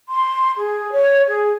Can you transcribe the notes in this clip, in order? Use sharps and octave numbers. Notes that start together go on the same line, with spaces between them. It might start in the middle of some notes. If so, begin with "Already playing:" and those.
C6
G#4
C#5
G#4